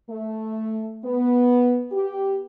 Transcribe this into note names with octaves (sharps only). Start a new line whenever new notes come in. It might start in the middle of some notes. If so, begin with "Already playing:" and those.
A3
B3
G4